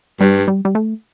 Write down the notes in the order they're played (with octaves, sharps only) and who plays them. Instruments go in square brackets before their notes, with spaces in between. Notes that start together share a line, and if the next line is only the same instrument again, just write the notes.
[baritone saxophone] G2 [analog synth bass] G3
[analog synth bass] G3
G3
A3